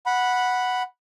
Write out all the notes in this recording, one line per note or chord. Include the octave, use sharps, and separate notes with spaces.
F#5 B5